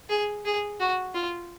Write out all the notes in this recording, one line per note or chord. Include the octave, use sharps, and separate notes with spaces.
G#4
G#4
F#4
F4